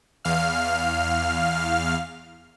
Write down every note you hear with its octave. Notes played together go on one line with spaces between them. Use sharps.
E2 F5 F6